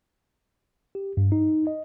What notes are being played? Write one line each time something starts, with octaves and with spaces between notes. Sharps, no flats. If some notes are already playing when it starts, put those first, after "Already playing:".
G4
G2
D#4
D#5